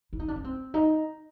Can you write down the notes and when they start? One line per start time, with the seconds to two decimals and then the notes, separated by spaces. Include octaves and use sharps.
0.13 E4
0.19 D#4
0.28 D4
0.36 C#4
0.44 C4
0.74 D#4